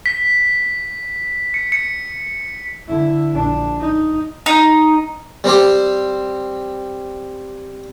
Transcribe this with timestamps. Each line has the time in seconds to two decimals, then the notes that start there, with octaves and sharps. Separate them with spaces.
0.06 B6
1.54 C#7
1.72 C#7
2.88 D3 E4
3.34 A#1 D4
3.80 D#4
4.46 D#4
5.44 G3 C4 G4 C5